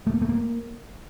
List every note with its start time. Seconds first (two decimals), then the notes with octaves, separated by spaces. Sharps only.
0.07 A3
0.14 A#3
0.22 A3
0.29 A#3